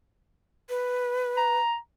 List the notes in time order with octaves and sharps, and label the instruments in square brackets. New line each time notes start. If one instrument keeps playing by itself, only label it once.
[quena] B4
[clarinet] A#5